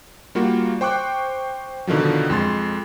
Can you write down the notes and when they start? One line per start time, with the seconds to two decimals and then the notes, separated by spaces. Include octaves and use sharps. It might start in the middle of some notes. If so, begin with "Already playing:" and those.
0.35 G3 A#3 F4 F#4
0.81 C5 G5 C#6 D6 F#6
1.87 B2 D3 D#3 F3 F#3
2.30 F2 G#3 C6 A6